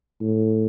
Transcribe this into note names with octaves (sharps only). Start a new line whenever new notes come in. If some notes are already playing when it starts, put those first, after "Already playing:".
A2